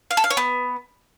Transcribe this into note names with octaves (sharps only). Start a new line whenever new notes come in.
F5
A4
F5
C#5
B3